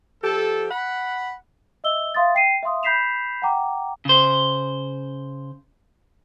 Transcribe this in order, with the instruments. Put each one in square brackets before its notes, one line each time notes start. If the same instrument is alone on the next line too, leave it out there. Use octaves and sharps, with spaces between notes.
[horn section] F3 G4 A4
F#5 B5
[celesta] D#5 E5 E6 G7
E5 F5 C6 D#6 A6
G5 C7 D#7
E5 F5 C6 D#6
B5 G6 B6 C7 E7 F7
F#5 G5 A#5 D6
[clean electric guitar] C#3 C5